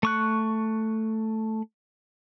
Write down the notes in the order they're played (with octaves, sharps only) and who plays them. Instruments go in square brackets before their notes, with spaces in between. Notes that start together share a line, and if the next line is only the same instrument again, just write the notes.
[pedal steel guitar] A3 C#6 F#6